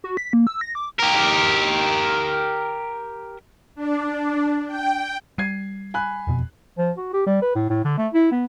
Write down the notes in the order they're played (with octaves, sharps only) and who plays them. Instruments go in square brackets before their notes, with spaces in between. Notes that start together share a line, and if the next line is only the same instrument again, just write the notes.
[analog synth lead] F#4
B6
A#3
E6
A#6
D6
[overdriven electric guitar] G4 A#4
[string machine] D4
G5
[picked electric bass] G3 [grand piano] G#6 C7 D#7
[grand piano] G#5 B5 F#6
[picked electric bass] E1 F2 B2
[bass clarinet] F3
F#4
G4
G3
B4
A2
A2
D3
A3
E4
B3